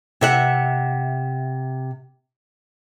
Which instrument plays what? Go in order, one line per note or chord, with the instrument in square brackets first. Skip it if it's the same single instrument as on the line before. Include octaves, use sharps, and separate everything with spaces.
[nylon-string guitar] C3 E5 F#5